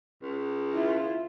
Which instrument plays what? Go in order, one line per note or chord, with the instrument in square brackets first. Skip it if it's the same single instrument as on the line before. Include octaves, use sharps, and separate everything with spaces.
[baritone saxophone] C#2
[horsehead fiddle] E4 F4